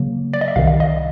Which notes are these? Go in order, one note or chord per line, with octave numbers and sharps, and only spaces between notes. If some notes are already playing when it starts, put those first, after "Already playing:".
Already playing: C#3 F#3 A#3
D5
D#5
E5
C2 C3 D#3 F5
F5
D#5